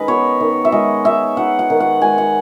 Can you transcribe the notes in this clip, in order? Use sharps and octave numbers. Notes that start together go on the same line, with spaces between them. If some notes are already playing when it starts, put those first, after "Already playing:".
Already playing: D#3 G#3 C#4 B4 D#5
B3 C#5
D#3
E5
G#3 D#5
D#4 E5
D#4 F#5
F#5
D#3
F#5
G#3 G#5
F#5